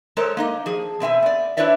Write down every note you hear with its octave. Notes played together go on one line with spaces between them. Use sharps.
G#3 A4 A#4 C5 C#5
A#3 D#4 D#5
F3 G#4
B2 C4 E5 G#5
B3 D5
D4 E4 B4 C#5 D5 E5